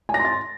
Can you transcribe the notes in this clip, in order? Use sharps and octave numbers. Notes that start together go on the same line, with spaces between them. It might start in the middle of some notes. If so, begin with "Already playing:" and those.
G#5
A#6
C6
A6